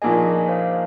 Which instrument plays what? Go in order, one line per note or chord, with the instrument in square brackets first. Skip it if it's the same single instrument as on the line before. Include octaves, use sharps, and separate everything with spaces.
[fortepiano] A#1 A#2 A#3 D#4 G#4 [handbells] D#5 G#5
[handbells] C5 F5